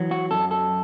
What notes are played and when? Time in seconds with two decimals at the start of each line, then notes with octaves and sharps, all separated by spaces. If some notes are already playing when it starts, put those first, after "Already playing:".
Already playing: E3 F#3
0.11 F#4
0.31 F#2 A4
0.51 A4